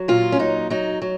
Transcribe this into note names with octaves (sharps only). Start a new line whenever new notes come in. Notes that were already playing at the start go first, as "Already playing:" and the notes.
Already playing: F#3
A#2 F4
C#4
F#3 D#4
F#3 D#4
F#3